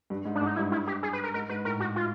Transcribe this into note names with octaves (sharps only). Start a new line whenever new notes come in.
G2
G#2
D4
G#2
D#4
G2 E4
E4
G4
G#4
B4
A#4
G#2 A#4
G#2 B4
A2 A#4
F#4
F4